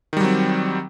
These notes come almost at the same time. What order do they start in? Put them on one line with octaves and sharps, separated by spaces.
D#3 G3 F#3 C4